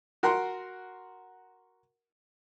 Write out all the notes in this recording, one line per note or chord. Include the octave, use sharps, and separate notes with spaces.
F#4 A#4 F#5 C6